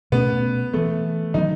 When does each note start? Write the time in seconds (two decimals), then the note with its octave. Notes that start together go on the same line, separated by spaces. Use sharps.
0.12 B2 A3 B3 C#4
0.73 E3 A3 B3
1.34 D#3 F#3 B3 D#4